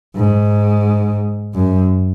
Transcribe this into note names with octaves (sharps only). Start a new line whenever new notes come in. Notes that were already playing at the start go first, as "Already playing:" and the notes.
G#2
F#2